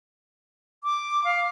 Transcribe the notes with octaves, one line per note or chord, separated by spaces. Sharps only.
D6
F5